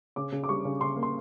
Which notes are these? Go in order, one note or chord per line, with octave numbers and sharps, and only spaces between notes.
C#3 D6
C#3
D6
G3 C#6
C#3
C#3 C6
A#3
C6